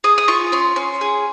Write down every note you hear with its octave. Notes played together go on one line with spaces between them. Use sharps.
G#4 D#6
D#6
F4 C#6
C#4 C6
C#4
G#4